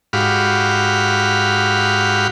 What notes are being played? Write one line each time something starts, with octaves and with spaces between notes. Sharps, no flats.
G#2 F#4 G4 F5 B5